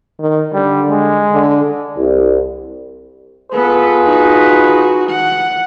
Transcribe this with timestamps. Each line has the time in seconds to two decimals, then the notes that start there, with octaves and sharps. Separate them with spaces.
0.20 D#3
0.53 D3 G3
0.90 G#3
1.32 D3
1.97 C2
3.53 B3 F4 G#4 A4 B4
4.05 D#4 F#4
5.10 F#5